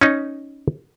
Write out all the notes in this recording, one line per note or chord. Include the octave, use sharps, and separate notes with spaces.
C#4 D#4